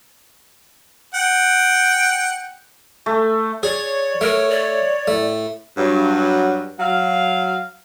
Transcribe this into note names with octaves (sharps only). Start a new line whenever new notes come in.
F#5 G5
A3
G#4 C#5 D5
A3 A#4
D5
A2 A3
G2 F#3
F#3 F5